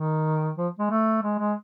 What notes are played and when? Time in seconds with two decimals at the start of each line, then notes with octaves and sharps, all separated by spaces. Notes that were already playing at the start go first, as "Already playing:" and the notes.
Already playing: D#3
0.58 F3
0.79 G#3
0.90 A3
1.23 G#3
1.39 G#3